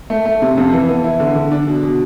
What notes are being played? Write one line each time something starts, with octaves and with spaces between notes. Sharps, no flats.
A3
A3
C3
F2
E3
B3
E4
D3
D3
D4
B2
B2